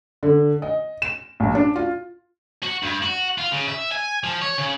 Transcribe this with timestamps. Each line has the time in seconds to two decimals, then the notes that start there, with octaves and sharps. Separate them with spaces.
0.23 D3
0.62 D#5
1.02 E7
1.40 A#1
1.55 D4
1.76 F4
2.63 F#4
2.83 G2
3.03 F#4
3.38 F4
3.52 C#3
3.68 E5
3.92 G#5
4.24 F3
4.42 C#5
4.58 C#3